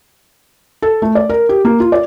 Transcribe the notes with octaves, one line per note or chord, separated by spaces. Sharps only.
A4
A3
D5
A#4
G4
A#3
F4
D5